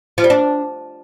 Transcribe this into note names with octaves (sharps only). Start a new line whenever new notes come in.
F3
G3
D4